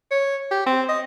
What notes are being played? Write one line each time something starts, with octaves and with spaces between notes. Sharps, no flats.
C#5
G4
C4
D#5